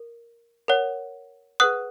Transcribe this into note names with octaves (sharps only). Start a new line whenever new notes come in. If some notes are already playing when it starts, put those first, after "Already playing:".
Already playing: A#4
A#4 C#5 F#5
G#4 B4 F#5 D#6 F#6